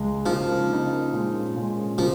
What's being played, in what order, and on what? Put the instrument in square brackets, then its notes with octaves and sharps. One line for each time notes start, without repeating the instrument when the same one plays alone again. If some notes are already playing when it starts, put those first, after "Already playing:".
Already playing: [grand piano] C#2 G#3
[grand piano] C#3 A#3 D#4 [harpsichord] F3
[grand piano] C#3 A#3 D#4
A#2 G#3 C#4
A#2 G#3 C#4
[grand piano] C#3 A#3 [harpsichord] F3